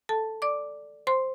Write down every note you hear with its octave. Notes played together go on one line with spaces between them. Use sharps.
A4 A5
D5 D6
C5 C6